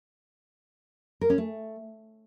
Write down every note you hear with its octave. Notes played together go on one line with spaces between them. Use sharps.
A#4
C#4
A3